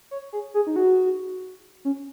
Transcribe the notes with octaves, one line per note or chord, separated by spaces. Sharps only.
C#5
G#4
G#4
D#4
F#4
C#4